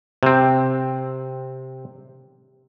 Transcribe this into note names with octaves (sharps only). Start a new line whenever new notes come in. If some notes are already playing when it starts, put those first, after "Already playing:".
C3 C4